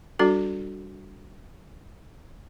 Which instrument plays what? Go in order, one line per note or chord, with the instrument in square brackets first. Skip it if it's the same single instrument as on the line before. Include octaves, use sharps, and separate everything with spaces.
[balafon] G3 D4 F#4 A4